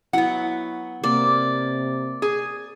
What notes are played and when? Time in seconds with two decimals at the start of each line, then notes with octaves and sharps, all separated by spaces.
0.13 F#3 B3 E4 F#5
1.03 C3 A#3 D5
2.22 G#4